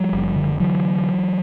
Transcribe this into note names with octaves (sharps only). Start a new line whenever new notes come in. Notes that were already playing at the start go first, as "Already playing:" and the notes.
Already playing: F3 G3
F#1
D3
D3 E3 F#3